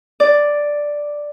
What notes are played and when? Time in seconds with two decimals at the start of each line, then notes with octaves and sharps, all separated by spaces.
0.20 D5